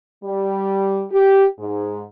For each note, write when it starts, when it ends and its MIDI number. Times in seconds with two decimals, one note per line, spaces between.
0.24 1.04 55
1.12 1.46 67
1.59 2.03 44